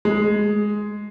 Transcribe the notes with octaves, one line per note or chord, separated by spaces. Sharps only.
G#3